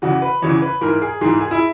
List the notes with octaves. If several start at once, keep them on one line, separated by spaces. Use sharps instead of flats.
E2 C#3 E3 F#4
B4
E2 C#3 E3 C#5
B4
G#2 E3 A#4
G#4
G#2 E3 G#4
G#4
E4